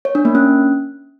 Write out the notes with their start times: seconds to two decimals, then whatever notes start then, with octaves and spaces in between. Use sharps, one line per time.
0.05 C#5
0.15 D4
0.25 A#3
0.35 C#4